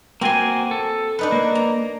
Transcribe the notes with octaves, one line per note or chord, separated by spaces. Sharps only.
A#3 C4 F#4 G#5 C6
A4
D4 D#4 B4
A#3
A#5